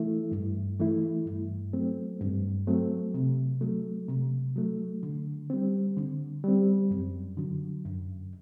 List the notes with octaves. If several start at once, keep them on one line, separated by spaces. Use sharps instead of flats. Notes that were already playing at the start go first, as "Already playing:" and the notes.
Already playing: E3 A3 E4
G2
E3 A3 E4
G2
F#3 A3 C4
G2
F#3 A3 C4
C3
F#3 A3
C3
F#3 A3
D3
G3 C4
D3
G3 C4
F#2
D3 F#3
F#2